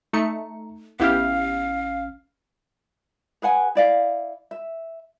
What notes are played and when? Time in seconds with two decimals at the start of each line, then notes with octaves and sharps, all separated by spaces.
0.13 A3 D#4 A#5 C#7
1.00 A1 B3 C#4 E4 G4 F5 F6
3.42 G#4 B4 F#5 G#5
3.75 E4 D5 F5
4.51 E5